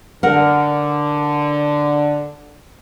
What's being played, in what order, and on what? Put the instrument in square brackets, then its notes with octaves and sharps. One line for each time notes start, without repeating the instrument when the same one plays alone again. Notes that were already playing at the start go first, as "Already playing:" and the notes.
[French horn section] D3 [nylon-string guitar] A#4 F#5